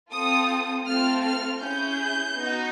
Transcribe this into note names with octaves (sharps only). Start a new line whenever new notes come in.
C4 F4 A4 D#6
A3 C4 F4 A4 F6
F6
C#4 E4 G#4 G6
B3 D#4 F#4